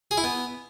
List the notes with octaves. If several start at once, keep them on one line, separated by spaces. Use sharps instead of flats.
G#4
E4
B3